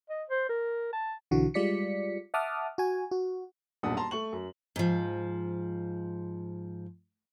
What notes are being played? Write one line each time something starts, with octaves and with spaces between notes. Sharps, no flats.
D#5
C5
A#4
A5
B1 D3 E3 F#4
G3 G#3 F4 D5 B6 C#7
E5 F#5 A5 D6 D#6 F6
F#4 G#5
F#4
D#1 B1 F#2 D4 F#5 D#6
A5 A#5 C6
A3 C#6 F#7
F#2
G#2 F3